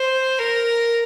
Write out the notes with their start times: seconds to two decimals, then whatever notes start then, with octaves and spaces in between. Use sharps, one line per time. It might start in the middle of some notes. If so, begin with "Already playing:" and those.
Already playing: C5
0.39 A#4